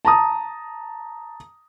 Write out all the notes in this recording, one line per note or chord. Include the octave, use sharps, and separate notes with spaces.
A5 A#5 D#6